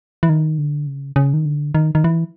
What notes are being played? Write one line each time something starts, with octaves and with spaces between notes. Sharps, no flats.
E3
D#3
D3
C#3
C#3
D#3
D3
D#3
D#3
E3